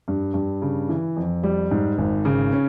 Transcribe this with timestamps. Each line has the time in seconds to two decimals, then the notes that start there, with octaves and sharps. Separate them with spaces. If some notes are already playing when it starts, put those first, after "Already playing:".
0.08 G2
0.34 G2
0.62 C#3
0.89 E3
1.16 F2
1.43 G3
1.71 G#2
1.98 G#1
2.25 C#3
2.53 C#4